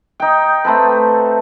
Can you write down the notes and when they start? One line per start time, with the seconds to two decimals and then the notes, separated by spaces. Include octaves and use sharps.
0.20 D#4 G5
0.65 A3 C4 A4 B4